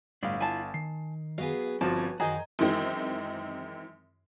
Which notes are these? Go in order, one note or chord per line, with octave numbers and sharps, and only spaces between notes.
G1 A2 G3 D4 F5
E4 F4 G#5 A5
D#3 C7
F#3 B3 G#4 F5
G1 F3 C4 C#4 F#4 B4 A5
F#2 D#3 F#4 G#4 C5 D#5 G#5 A#5
F#2 D#3 E3 G#3 C4